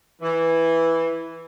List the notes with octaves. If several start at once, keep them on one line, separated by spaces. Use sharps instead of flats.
E3